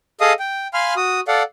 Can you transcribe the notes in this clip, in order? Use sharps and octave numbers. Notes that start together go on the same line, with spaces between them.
G#4 A4 D#5 F5 D#6
G5
F5 G#5 B5 C6 F6
F#4 D#6
A4 D5 F5 F#5